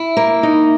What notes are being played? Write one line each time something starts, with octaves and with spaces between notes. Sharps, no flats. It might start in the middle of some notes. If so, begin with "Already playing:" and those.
Already playing: E4
A#3
D#4